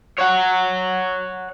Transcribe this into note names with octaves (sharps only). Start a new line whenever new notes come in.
C#5 F#5